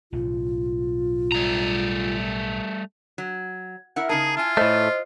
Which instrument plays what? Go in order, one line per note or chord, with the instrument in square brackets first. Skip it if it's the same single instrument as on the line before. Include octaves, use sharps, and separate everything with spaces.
[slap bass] B1 A2 C#3 [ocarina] F4
[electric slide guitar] G3 A3 A#5
[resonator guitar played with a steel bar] F#3
E4 A#4 F#5
[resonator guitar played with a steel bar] C#3 D#4 A#4 [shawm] G#4 [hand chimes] A5
[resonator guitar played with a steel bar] E4 G#5 [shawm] F4
[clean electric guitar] A2 A3 [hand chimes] C5 D#5